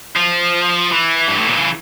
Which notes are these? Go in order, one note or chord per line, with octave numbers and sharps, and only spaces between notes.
F3
E3
G2
A2
A#2
C#3